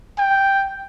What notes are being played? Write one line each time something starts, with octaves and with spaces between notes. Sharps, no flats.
G5